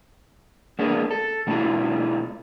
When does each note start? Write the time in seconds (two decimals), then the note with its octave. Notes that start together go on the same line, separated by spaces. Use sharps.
0.79 G#3 A#3 B3 D4
1.11 A4
1.47 B2 G#3 D4 E4 F4